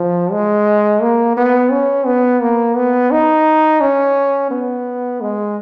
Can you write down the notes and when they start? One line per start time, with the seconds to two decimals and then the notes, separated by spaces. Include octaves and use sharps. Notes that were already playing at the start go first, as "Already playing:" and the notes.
Already playing: F3
0.31 G#3
1.01 A#3
1.37 B3
1.71 C#4
2.06 B3
2.41 A#3
2.76 B3
3.11 D#4
3.81 C#4
4.50 B3
5.21 G#3